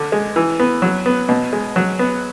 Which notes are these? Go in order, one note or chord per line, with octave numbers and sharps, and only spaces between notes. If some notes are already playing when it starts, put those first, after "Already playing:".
Already playing: D3
G#3
E3
B3
F#3
B3
B2
G#3
F#3
B3